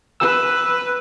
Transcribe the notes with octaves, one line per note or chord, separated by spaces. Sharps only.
B4 E6